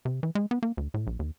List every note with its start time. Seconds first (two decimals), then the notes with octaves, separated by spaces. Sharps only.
0.05 C3
0.23 E3
0.35 G#3
0.51 B3
0.63 A#3
0.77 D2
0.94 A2
1.07 A#1
1.19 D#2